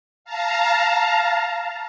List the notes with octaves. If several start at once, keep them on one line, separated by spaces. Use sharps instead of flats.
F5 A5 A#5